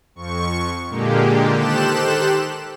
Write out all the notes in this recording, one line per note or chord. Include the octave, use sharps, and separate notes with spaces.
F2 C#6
A#2 D3 G#3 A#3 G4
D#3 G4 A4 C5 F#6 E7